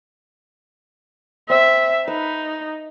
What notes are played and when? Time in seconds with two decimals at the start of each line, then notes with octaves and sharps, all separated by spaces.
1.50 C4 E5
2.08 D#4 B4